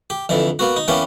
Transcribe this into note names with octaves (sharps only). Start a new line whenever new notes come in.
G4
F2 D3 E3
A#3 B3 F#4
D#4
E3 A#3 B3 C#4 G4